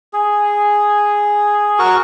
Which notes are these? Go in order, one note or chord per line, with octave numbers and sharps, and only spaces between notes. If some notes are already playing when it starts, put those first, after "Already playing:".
G#4
F#4 A#4 C#6